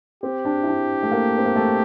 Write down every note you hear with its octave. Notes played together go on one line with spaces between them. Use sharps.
C4 G4
D4
E4
D4
A3
A#3
C4
A#3
A3